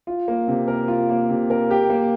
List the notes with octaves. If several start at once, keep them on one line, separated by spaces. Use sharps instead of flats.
F4
A#3
C3
A#4
F4
A#3
C3
A#4
G4
A#3